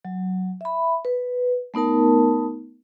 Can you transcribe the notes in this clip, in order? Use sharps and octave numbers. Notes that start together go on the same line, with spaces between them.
F#3
E5 B5
B4
A3 B3 D#4 A#4 A5